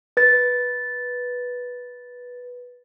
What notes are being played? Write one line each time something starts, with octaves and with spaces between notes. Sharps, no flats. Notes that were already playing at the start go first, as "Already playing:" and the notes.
B4 A6